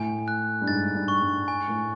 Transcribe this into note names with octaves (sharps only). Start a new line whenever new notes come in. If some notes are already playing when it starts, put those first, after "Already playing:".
Already playing: A2 G#5
F#6
G2
G#2 A6
G2
C#6
G2
G#5
A2